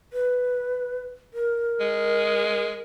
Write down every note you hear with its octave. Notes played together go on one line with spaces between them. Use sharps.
B4
A#4
G#3